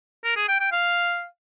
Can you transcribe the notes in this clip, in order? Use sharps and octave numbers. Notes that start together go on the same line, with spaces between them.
A#4
G#4
G5
G5
F5